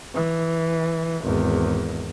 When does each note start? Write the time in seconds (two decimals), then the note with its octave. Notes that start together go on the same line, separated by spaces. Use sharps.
0.15 E3
1.23 G#1 E2